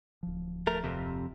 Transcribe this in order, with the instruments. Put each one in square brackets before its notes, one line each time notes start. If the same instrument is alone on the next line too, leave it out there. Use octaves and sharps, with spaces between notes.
[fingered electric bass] D1 F3
[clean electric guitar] A3 A#4
F2 C3